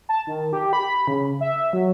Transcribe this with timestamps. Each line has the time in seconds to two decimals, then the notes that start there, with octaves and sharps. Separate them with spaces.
0.09 A5
0.27 D#3
0.53 G4
0.73 B5
1.08 C#3
1.41 E5
1.73 F#3